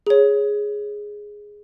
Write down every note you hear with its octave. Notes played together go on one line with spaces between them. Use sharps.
G#4 C#5